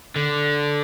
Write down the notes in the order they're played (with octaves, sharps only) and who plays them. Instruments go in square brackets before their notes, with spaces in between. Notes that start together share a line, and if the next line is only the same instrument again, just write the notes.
[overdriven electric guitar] D3